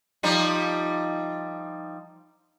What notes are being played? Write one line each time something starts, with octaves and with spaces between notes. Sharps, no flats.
F3 G3 D#4